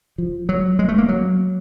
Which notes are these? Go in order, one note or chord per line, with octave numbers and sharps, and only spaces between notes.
F3
F#3
G#3
A3
A#3
F#3